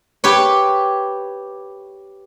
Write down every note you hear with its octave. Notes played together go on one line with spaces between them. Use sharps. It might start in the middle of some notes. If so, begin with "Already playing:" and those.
G4 B4 C#5